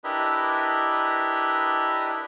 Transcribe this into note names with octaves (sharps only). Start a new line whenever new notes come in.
D4 E4 G4 A#4 B4 D#5